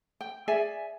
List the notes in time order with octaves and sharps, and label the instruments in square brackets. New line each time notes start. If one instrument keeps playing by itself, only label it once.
[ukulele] G5
G#4 D5 E5 G#5